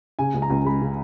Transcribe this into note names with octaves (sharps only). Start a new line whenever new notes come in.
C#3 G#5
C#2
A#5
C#2
G#3 B5
C#3